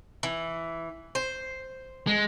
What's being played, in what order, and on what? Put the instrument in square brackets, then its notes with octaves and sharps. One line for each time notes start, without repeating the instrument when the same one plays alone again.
[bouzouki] E3
C5
[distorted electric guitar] G#3